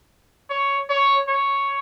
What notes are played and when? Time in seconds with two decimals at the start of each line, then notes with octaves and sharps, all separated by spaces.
0.50 C#5
0.90 C#5
1.28 C#5